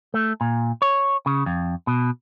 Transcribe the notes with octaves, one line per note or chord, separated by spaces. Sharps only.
A3
A#2
C#5
C#3
F2
B2